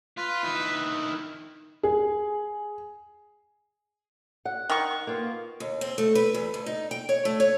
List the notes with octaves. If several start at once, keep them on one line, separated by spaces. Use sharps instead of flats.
F4 B4
D#3 E4
G#4
F#5
D#3 C#6
A#3 B3 F4
D#2
C4
A3
B4
E2
D2
D#4
G5
C#5
A3
C#5